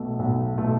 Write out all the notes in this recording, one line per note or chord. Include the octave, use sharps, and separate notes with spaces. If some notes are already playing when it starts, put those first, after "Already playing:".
Already playing: B1 B2 A3
B1
B2 A3